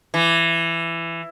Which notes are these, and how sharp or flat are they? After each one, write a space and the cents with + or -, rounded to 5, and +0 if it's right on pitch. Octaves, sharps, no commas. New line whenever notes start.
E3 +15